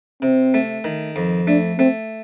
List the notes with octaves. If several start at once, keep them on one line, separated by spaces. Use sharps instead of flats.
C3 C4
A3
D#3
F2
A3 D4
A3 C4